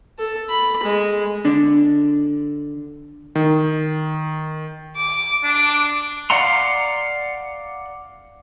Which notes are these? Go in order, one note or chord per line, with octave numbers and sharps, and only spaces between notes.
A4
B5
G#3
D3 D4
D#3
D6
D4 D6
D5 F5 F#5 A#5 C6